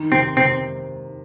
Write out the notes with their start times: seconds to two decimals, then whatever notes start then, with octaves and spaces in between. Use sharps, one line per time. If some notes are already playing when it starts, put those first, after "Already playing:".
Already playing: D#3
0.12 C3 C4
0.37 C3 C4